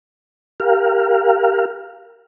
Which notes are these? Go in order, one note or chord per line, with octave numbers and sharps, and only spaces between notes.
G4 A#4 F5